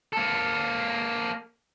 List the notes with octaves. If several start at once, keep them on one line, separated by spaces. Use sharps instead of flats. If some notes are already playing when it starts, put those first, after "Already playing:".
A#3 A4